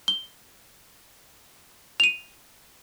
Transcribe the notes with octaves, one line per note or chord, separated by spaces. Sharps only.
G7
D#7 F7